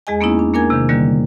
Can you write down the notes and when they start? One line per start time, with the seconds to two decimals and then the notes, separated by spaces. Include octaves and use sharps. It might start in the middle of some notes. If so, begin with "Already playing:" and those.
0.07 E2 G#3 G#4 D#5 G#5
0.21 A#3 B3 C#4 D#4 E4
0.39 D4
0.54 A#3 D4 A#4 G#5 G#6
0.70 C3 D#3
0.89 D3 D#3 G3 A#3